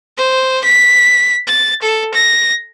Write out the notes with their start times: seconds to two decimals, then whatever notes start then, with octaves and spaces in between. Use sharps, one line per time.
0.17 C5
0.64 B6
1.47 A6
1.82 A4
2.14 A#6